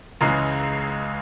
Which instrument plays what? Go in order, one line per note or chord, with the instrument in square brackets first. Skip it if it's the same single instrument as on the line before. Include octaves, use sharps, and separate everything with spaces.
[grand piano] C#2 C#3 E3 G#3 A#5